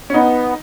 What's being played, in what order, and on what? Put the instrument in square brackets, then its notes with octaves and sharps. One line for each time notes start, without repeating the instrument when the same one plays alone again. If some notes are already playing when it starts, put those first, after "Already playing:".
[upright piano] C#4
[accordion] B3 [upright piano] D#4